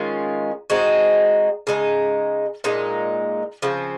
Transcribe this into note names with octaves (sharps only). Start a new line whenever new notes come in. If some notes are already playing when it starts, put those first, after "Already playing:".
Already playing: D#3 G#3 C#4 F4
G#3 C4 D#4 F#4
C#3 G#3 D#4
A#2 G#3 D#4
C#3 F3 C4